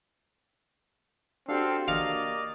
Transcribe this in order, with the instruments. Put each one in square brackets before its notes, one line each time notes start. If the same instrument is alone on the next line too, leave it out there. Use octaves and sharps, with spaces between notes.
[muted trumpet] C4 [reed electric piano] D4 F#4 G4 [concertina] A4 F5
[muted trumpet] A#3 [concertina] D5 D#5 [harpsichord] F5